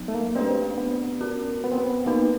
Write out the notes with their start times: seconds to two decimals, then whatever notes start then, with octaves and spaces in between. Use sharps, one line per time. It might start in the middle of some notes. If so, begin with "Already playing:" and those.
Already playing: F#3 B3 D#4
0.08 A3
0.15 A#3
0.35 A3 C4 D4 G4 B4 D5
0.78 B3
1.21 C#4 F#4 A#4
1.64 B3
1.72 C4
1.78 B3
2.06 A#3 B3 D#4 F#4 B4